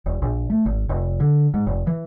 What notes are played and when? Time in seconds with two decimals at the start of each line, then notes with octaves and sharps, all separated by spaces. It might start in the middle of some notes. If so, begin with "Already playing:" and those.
0.06 E1
0.22 A#1
0.50 A3
0.66 G#1
0.89 F1
1.20 D3
1.54 G#2
1.67 F1
1.87 E3